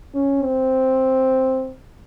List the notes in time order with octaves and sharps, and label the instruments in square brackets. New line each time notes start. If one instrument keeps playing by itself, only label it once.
[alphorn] C#4
C4